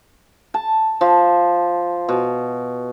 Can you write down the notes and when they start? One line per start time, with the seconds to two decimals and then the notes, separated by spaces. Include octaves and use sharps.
0.54 A5
1.01 F3
2.09 B2